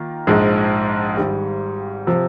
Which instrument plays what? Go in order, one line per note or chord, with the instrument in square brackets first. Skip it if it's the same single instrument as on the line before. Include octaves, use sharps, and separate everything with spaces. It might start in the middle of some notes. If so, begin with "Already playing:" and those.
Already playing: [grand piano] D#3 A#3 F4
A#1 G#2 F3 G#3
G#1 G#2 G3
C3 F3